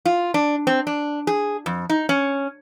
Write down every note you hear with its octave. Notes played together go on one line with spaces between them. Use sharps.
F4
D4
C4
D4
G#4
F2
D#4
C#4